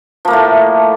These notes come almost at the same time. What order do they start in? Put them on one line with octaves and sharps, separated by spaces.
F3 A#3 A3 A2